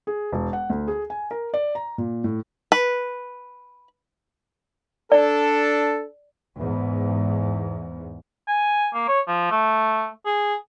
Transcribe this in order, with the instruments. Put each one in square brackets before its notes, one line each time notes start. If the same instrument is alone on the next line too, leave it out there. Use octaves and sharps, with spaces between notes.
[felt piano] G#4
E1
F#5
D2
G#4
G#5
A#4
D5
A#5
A#2
A2
[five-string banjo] B4
[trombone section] D4 A4 [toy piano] D5
[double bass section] E2 G#2
[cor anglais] G#5
A#3
C#5
F3
A3
G#4